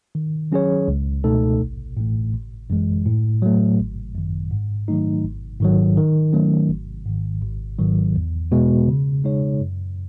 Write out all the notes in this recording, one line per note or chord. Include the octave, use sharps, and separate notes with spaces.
D#3
F#3 C#4 G#4 C#5
C#2
B2 A3 D#4 A4
A1
A2 E3 A3
G#1
F#2 E3 G#3
A2
F#3 A3
G#1
F#2 D#3
G#2
D#3 F#3 A3 D#4
G#1
G#2 D#3 F#3
D#3
F#3 A3 C#4
G#1
G#2 D#3
G#1
G#2 D#3 F#3
E2
B2 G#3 B3 F#4
C#3
G#3 D#4 G#4 C#5
F#2